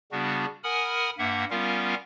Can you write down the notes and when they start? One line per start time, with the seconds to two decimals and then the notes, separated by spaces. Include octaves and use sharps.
0.12 C#3 G3 B3 D4 F#4
0.64 A#4 F#5 G#5 B5 D#6 F6
1.18 G2 A#3 E5 F#5
1.51 G3 B3 C#4 F4 A#4 F5